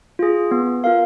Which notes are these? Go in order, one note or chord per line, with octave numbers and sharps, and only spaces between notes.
F4 G#4
B3
F4 A#4 F5